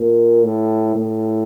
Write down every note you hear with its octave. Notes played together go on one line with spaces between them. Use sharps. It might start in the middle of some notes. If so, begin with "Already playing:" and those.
Already playing: A#2
A2
A2